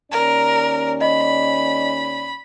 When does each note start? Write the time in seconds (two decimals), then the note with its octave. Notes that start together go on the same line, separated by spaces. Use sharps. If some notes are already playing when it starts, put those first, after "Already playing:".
0.12 D#2 C#4 A#4 D5
1.01 D#5 B5